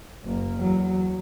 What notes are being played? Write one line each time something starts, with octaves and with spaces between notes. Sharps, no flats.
F#1 A#3
E2 F#3